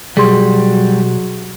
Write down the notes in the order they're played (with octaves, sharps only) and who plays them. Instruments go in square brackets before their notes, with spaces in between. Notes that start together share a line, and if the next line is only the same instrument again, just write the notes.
[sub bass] B2 [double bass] F#3 [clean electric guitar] G3 [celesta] G#4 C6